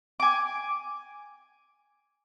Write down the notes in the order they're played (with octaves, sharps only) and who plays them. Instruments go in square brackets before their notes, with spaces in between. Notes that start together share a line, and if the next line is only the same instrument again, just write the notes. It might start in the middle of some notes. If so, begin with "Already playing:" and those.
[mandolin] G#5 D6